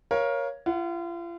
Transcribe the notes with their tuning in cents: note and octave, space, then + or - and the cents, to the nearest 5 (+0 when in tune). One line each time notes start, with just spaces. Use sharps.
A#4 +20 C#5 +0 F5 -20
F4 -40 F#5 +0